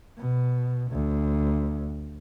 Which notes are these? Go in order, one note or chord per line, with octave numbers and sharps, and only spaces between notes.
B2
D2